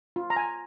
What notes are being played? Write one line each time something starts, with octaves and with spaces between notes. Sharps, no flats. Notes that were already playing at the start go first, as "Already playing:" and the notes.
F4
A#5
G#5